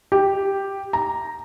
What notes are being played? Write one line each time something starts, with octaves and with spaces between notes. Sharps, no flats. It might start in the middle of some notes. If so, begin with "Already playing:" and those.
G4
A#5